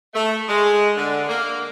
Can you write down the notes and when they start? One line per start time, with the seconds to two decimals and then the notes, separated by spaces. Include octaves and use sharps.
0.14 A3
0.47 G#3
0.96 D3
1.29 A#3